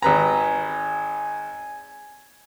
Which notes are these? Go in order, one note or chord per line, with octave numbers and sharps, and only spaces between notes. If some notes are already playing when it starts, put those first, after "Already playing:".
G#1 B4 G#5 A#5